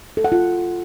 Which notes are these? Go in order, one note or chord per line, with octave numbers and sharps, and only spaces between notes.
A4
F#5
F4